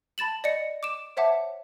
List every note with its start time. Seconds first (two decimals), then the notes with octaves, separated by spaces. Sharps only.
0.18 A5 B5 A6 E7 F#7
0.44 D5 D#5 C#7
0.83 D6 D7 E7
1.17 C5 C#5 E5 F#5 A5 D6